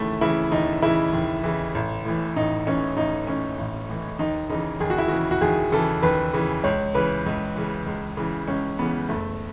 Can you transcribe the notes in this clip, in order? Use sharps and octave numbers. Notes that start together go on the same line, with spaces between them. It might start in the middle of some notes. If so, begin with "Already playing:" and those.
Already playing: D#2 C#3 E3 A3 E4
C#3 E3 E4
D#2 D#4
C#3 E3 E4
D#2
C#3 E3
A1
A2 E3
A1 D#4
A2 E3 C#4
A1 D#4
A2 E3 C#4
A1
A2 E3
D#2 D#4
C#3 E3 D#4
D#2 G#4
F#4
E4
C#3 E3 F#4
F#4
D#2 G#4
C#3 E3 A4
D#2 B4
C#3 E3
C#2 C#5
C#3 E3 B4
C#2
C#3 E3
C#2
C#3 E3
C#2 C#4
C#3 E3 B3
F#1 A3